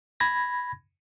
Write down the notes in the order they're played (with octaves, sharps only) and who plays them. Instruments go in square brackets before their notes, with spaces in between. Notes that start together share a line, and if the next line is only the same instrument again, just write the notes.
[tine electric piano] B5 G#6 A#6